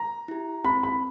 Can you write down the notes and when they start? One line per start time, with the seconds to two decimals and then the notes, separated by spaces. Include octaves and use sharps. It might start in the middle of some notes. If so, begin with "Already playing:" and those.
Already playing: A#5
0.28 E4 G4
0.64 C4 B5
0.83 B5